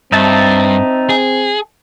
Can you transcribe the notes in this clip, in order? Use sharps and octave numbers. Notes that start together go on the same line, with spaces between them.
G2 C4 D#4 E5 A5
G#4